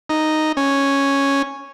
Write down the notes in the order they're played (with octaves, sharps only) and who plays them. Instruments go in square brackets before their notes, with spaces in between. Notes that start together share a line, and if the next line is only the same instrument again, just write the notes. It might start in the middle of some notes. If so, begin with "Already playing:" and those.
[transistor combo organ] D#4
C#4